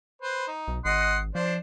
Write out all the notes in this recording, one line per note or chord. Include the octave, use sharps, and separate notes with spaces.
B4 C5
D#4
B1
G#1 D#5 F#5 C6
F3 D4 C5